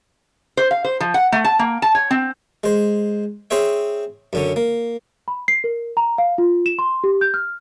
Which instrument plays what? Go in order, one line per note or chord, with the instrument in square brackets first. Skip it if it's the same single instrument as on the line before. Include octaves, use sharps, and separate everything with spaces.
[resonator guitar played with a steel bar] C5
F5
C5
F3
F#5
A3
A5
A#3
A5
C#5
C4
[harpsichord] G#3 C5
C4 G#4 C5 C#5 E5
F#2 D3 C#4
A#3
[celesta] B5
C7
A#4
A#5
F5
F4
E7
C6
G4
G6
F6